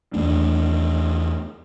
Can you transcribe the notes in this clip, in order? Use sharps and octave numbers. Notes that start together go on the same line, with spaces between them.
E2 A3 D4